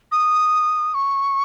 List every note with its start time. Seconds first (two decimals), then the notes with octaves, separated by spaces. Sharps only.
0.12 D#6
0.94 C#6